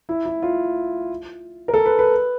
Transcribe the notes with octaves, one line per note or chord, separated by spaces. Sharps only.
E4
E4
F4
A#4
A4
B4
B4